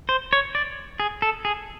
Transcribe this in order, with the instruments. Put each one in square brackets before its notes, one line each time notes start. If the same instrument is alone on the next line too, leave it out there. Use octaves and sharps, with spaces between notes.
[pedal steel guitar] C5
C#5
D5
G#4
A4
G#4